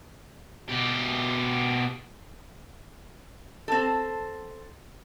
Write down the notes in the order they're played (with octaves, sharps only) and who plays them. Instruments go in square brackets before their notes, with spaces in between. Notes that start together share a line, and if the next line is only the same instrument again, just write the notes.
[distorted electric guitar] B2 G4
[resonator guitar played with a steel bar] C4 A4